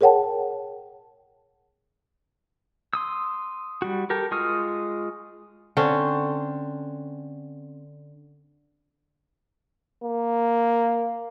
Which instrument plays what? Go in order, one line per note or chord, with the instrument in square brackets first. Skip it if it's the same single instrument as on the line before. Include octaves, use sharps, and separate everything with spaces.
[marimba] G#4 A#4 C#5 F#5 G5 A5
[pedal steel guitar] C6 D#6 E6
G3 F#4
G4 A4 A#4
G#3 F4 C#6 D#6 F6
[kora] D3 C4 C#4
[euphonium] A#3